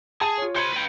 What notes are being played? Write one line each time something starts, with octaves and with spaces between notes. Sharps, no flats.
G#4 A5
F4 C#5
C5 B5 C6 G#6 C#7
B4 G5